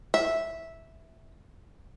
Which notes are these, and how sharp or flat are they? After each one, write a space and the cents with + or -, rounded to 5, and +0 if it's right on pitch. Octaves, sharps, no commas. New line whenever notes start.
E5 -10